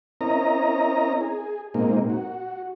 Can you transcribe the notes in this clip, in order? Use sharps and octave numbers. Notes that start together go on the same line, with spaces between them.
C4 C#4 E4 A#4 D#5 A#5
G#4
A#2 G#3 A#3 C4 D#4
F#4